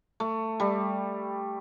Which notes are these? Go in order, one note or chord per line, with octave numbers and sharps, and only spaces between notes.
A3
G3